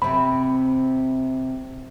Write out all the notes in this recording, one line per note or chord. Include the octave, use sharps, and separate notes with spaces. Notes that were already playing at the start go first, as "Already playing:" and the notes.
C3 C4 B5